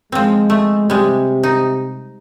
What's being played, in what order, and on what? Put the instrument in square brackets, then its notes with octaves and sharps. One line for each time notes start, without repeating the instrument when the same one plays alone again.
[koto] F3 C4 [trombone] G#3
[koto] A3
[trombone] C3 [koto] G3 G#3
[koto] D#4